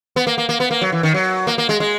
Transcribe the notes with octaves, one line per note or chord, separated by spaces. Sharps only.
B3
A#3
A#3
A#3
B3
A#3
F#3
E3
D#3
F#3
A#3
A#3
G#3
G#3